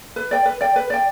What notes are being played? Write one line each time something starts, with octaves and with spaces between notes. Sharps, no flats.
B4
D5 G5
B4
D5 G5
B4
D5 G5